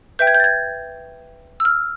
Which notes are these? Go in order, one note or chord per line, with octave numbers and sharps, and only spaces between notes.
B4 E5 G5 G6
G#6
G6
A6
G#6
E6
F6